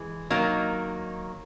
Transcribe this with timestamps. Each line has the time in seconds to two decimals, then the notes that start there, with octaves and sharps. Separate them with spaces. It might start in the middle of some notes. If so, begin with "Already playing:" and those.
Already playing: E3 G#3
0.30 D#3 F#3 A#3 D#4